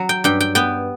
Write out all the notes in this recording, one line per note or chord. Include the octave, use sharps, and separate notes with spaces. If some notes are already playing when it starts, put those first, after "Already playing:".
Already playing: F#3
G5
G2 G5
G5
B3 G5